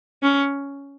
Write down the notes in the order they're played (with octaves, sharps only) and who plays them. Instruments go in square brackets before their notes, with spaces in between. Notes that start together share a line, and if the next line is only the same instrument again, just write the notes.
[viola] C#4